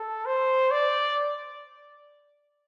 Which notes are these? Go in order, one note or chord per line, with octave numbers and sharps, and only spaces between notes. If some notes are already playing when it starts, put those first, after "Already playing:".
Already playing: A4
C5
D5